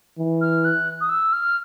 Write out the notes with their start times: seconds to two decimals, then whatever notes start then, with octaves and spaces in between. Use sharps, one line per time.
0.19 E3
0.41 F6
0.65 F#6
1.01 D#6
1.09 E6
1.33 F6